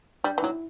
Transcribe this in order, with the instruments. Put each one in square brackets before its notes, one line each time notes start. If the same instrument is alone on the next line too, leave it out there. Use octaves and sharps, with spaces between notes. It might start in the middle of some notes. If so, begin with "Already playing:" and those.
[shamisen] G3 [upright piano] D4
[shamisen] E3
[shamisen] F#3 [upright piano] E4